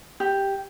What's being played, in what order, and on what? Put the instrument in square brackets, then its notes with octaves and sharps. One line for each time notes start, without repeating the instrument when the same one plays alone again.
[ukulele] G4